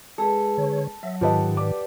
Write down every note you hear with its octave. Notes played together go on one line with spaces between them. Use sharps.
G#3 G#4 A4 B4
D3 C#5
F#3 C#5 E5
G#2 D#3 F4 G4 A4 B4 D#5 F#5
B4 D5 D6